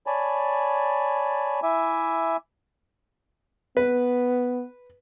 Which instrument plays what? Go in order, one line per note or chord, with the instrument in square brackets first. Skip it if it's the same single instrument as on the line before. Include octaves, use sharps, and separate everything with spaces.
[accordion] C#5 D5 G#5 A5 B5
E4 E5 G#5 D6
[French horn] B3 [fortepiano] B4